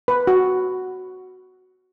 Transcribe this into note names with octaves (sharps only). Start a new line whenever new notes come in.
B4
F#4